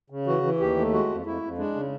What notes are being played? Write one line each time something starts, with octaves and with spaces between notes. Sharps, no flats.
C#3
E3 F#4
E3
D#2 G4
A3
G#3 F#4
F2
F2 E4
F2
G#3 D4
C#3